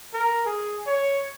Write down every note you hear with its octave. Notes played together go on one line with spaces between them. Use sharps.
A#4
G#4
C#5